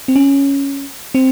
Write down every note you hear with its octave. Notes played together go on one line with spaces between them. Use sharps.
C4
C#4
C4